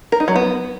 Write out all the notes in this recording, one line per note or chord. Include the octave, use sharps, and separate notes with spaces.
A#4
D#4
F#3
B3